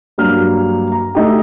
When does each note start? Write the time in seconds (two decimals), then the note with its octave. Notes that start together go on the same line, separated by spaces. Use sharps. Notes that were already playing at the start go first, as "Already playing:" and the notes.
0.18 G2 F#3 G3 A#3 F6
0.92 A#5
1.15 A3 D#4 G4